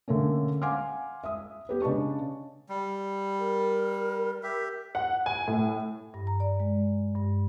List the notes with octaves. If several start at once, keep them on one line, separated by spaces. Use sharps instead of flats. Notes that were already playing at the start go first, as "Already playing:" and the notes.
D3 A3 A#3 C#4
F5 F#5 G#5 C6 D6 F6
E5 D#6
B3 G4 B4
C#3 D4 D#5 A5 C#6
G3
A#4
G4 E5
F#5
G#5
A2
G2
A#5
D5
G#3
G2